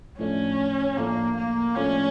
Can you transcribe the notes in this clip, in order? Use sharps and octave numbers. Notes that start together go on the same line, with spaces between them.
A2 F3 A3 C#4 D4
A2 F3 A3 A#3 D4
A#3
A2 F3 A3 C#4 D4